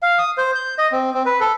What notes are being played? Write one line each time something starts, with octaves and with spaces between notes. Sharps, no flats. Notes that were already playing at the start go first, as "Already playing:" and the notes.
F5
D#6
C5
G6
D#5
C4
C4
B4
A4